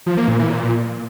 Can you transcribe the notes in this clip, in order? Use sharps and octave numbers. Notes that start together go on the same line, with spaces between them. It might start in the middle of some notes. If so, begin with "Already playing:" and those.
F3
A#3
A#2
E3
A#2